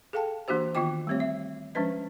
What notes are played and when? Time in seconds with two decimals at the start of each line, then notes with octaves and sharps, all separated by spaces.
0.13 G#4 A4 F5 G5 A5
0.48 E3 A#3 D4 F#4 G4 C5
0.75 D#3 B3 F4 D#5 G5 D6
1.07 G3 A3 C4 G4 C#5
1.20 E5
1.75 F3 G#3 C#4 D4 B4 D#5